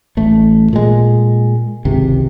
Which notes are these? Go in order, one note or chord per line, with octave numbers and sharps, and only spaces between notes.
A1 A3
A#2 G#3
G#1 C#2 C3